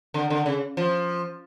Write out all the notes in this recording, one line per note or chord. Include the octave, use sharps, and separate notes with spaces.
D3
D3
C#3
F3